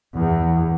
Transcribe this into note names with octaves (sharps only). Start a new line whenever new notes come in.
E2